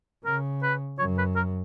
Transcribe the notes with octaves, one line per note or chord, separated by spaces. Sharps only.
C#3 A#4
B4
F#2 C#5
B4
A#4